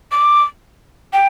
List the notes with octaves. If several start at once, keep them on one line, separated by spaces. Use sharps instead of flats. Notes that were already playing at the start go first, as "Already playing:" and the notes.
D6
G5